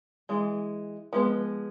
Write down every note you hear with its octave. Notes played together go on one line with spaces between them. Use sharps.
E3 G#3
F3 G#3 B3